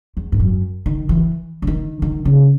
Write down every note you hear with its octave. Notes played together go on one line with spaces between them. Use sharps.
E2
G#2
F#2
D#3
E3
C#3
D#3
D#3
C#3